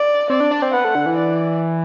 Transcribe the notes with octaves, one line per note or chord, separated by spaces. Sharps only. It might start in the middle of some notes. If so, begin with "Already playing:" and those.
Already playing: D5
C4 D5
D4
D4
C4
B3 F#5
A3
D3
E3
D5